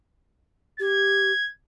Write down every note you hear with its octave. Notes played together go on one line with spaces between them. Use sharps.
G4 G#6